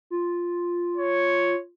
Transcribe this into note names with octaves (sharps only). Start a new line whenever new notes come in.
F4
C#5